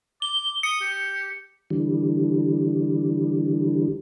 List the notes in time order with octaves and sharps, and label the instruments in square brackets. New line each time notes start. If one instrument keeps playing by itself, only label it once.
[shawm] D6 [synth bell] G7
[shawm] D#6 [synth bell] C#7
[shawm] G4
[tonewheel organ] D3 E3 G3